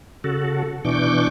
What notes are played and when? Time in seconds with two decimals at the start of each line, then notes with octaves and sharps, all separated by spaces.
0.24 C#3 F#4 A4
0.85 B2 E3 D4 C#6 D6 G6